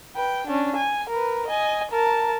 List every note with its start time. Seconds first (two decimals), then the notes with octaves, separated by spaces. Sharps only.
0.16 B4 G5
0.47 C#4 D4
0.76 G#5
1.10 A#4 B4
1.47 D#5 G#5
1.91 A#4 A5